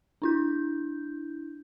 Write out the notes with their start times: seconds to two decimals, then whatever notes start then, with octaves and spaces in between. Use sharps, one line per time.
0.22 D4 E4 G6